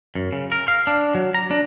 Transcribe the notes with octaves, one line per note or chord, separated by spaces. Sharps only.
F#2
C#3
A#4
F5
D4
F#3
A#5
D4